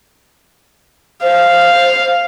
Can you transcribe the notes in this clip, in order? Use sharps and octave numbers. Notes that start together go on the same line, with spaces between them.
C5 F5